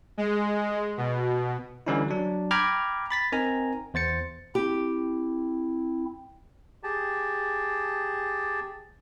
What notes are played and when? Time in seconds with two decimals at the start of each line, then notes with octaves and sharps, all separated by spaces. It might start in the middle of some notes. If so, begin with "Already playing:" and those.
0.18 G#3
0.97 B2
1.87 D3 E3 G3 C#4 D#4 E4
2.08 F#3 D4
2.51 G5 A#5 B5 D6 F6 G#6
3.10 B5 A6 B6
3.32 C4 D#4 A#4 G#5 A#5
3.94 E2 C5 A6 C#7
4.55 C4 E4 G4
6.83 G4 G#4 A5